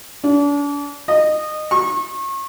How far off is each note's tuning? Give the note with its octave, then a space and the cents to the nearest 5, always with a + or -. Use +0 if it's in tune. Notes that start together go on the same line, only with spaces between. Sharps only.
D4 -40
D#5 -20
C#6 -35